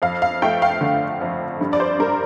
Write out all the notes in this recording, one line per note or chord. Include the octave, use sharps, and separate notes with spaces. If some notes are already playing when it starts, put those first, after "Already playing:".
F2 F5
F5
A3 G5
F5
D3
F2
G2
D5
C5
G2 A#4